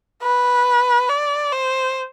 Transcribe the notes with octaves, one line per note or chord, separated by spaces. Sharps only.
B4
D5
C5